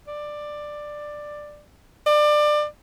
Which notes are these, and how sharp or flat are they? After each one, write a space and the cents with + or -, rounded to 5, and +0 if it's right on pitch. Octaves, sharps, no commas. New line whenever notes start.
D5 +10
D5 +25